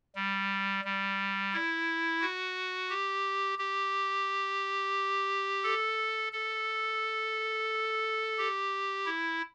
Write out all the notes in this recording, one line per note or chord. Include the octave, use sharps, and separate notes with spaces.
G3
G3
E4
F#4
G4
G4
A4
A4
G4
E4